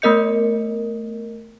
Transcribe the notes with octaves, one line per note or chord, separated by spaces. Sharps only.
A3 B3 A#4 D#5 G6 C#7